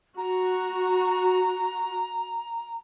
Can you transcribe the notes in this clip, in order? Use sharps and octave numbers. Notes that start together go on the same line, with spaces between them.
F#4 A#5